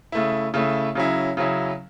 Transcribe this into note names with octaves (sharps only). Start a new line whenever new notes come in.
C#3 A3 E4
C#3 A3 E4
C#3 F#3 C#4 E4
C#3 F#3 C#4 E4